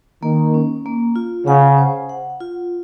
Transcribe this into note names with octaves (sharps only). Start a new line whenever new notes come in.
D#3 A#3
C#4
A#3
F4
C#3 F#5
C5
F#5
F4